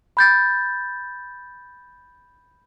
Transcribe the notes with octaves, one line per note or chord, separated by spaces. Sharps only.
B5 G6 A6